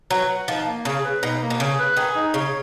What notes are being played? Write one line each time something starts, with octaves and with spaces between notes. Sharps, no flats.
F#3 B4
F#5
F3 D#4
A#3
C#3 G#4
B4
B2 D#4
A#3
B2
C#3 G#4
B4
D#3 G#4
D#4
C#3 C#5